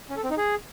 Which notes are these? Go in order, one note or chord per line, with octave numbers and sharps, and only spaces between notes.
C#4
A4
C4
D#4
G#4